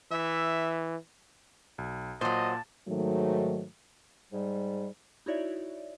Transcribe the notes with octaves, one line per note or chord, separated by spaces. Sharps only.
E3 E5
B1
A#2 F#3 C5 D#5 A5
G#2 D#3 F#3 A3
G#2 G3
D#4 E4 F#4 C#5 D5 E5